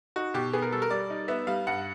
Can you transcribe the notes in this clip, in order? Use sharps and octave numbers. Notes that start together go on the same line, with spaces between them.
D#4 F#4
B2 G4
B3 G#4
A#4
G3 A4
A#4
G3 D5
D#4
B3 E5
G3 F5
G2 F#5